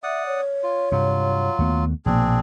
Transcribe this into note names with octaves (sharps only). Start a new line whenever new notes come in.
D5 E5 F#5 D#6
C#5
F4
G2 C3 F#3 F4
D#2 A3 B3
A#1 B2 A#3 C4 D4 G#4